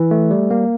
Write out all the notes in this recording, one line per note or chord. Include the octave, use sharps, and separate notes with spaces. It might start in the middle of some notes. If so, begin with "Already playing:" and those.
Already playing: E3
A3
G3
A#3